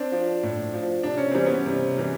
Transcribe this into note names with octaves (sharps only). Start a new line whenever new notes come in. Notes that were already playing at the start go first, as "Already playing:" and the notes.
Already playing: C4 D4
F3
A2
F3
C3 D4
C#4
E3 G3 C4
B3 C#4
C3
E3 G3